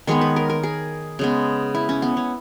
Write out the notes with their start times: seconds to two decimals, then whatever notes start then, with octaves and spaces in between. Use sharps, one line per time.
0.07 D#3 G#3 B3 C#5
0.21 B4
0.36 A#4
0.50 A#4
0.63 G#4
1.19 C#3 G#3 B3
1.75 E4
1.89 C#4
2.02 B3
2.17 C#4